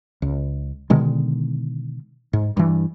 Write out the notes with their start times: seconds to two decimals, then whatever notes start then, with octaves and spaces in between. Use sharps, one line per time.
0.22 C#2
0.90 B2 D3 D#3 G#3
2.33 G#2
2.57 G2 E3